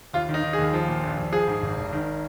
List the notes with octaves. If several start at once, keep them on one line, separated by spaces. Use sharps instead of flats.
D#2 F4
D#3
D#4
D#3
G#4
D#2
F3
A#2
A#1
A#1
F3 G#4
G#2
G#1
G#1
D#3